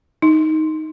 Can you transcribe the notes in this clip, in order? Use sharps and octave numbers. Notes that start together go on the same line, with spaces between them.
D#4